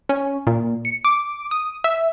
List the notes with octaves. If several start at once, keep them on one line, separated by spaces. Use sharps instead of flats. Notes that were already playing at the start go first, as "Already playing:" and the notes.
C#4
A#2
C#7
D6
D#6
E5